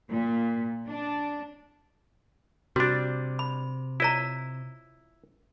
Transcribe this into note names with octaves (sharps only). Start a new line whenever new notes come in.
A#2
D4
C3 G3 D4 F#4
B5
E4 F4 C#5 D#5 A#5